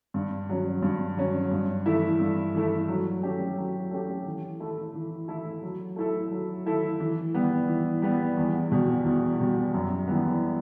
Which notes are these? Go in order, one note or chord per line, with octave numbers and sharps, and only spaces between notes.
G2
F#3 C#4
G2
F#3 C#4
G2
E3 A3 E4
G2
E3 A3 E4
F#3
A3 C#4 G4
F#3
A3 C#4 G4
E3
A3 E4 A4
E3
A3 E4 A4
F#3
A3 E4 A4
F#3
A3 E4 A4
E3
G3 B3
E3
G3 B3
E2
B2 G3
E2
B2 G3
F#2
E3 G3 B3